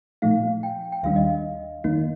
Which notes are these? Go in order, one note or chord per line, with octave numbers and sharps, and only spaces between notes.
A#2 F3 A3 D#4 F5
G5
G5
D#2 D#3 G3 D4 F5
D#5
F2 D#3 A#3 D#4 D#5